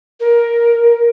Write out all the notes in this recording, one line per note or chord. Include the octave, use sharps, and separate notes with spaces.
A#4